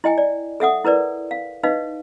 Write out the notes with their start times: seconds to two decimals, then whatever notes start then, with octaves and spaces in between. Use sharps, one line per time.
0.04 E4 D#5 G5 G#5
0.18 D5
0.60 A4 E5 F#5 D#6
0.84 E4 A#4 B4 D5
1.31 F5
1.64 D#4 B4 D#5 F5